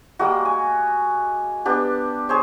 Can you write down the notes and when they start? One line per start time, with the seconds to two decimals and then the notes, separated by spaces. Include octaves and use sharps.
0.19 G3 G#3 A#3 F#4
0.45 G#5
1.65 B3 D4 G4
2.29 G#4 C5 C#5